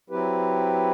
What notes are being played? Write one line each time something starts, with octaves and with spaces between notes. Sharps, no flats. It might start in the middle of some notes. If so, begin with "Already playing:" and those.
F#3 C4 E4 G4 B4